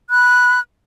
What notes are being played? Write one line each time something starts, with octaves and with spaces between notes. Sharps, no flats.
B5 F#6